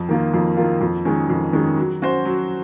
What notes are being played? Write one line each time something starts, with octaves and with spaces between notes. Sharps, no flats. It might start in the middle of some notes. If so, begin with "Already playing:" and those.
Already playing: F2
D#3 A#3 F4
F2
D#3 A#3 F4
F2
D#3 G#3 C#4
F2
D#3 G#3 C#4
F#3
C#4 F#4 C5
F#3